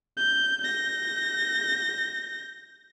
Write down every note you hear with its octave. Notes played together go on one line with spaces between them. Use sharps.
G6
G6 A#6